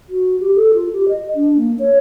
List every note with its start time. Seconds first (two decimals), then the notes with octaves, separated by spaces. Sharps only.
0.09 F#4
0.40 G4
0.56 A4
0.74 F4
0.93 G4
1.09 D#5
1.35 D4
1.57 A#3
1.79 C#5